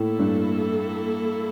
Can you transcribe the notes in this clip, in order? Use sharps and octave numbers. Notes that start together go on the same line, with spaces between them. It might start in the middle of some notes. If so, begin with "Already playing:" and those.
Already playing: A2 A#3 E4 A4
G2